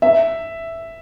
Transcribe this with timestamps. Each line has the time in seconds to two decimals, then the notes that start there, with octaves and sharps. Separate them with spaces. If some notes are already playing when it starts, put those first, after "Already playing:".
0.02 E5